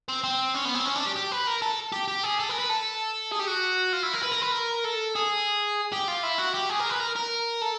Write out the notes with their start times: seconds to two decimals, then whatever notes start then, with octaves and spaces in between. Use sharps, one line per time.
0.09 C4
0.24 C4
0.55 C#4
0.65 B3
0.75 C4
0.85 C#4
0.95 D4
1.06 G4
1.16 G4
1.32 B4
1.47 A#4
1.62 A4
1.92 G4
2.08 G4
2.23 G#4
2.39 A4
2.49 A#4
2.59 B4
2.70 A4
3.32 G#4
3.39 G4
3.47 F#4
3.93 F4
4.03 E4
4.13 A#4
4.23 B4
4.32 A#4
4.42 B4
4.52 A#4
4.85 A4
5.15 G#4
5.93 G4
6.08 F4
6.23 E4
6.38 F#4
6.54 G4
6.69 G#4
6.79 A#4
6.89 B4
7.00 A#4
7.16 A#4
7.62 A4